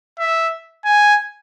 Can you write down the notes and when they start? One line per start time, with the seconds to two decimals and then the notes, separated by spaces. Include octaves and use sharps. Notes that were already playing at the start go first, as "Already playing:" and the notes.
0.19 E5
0.85 G#5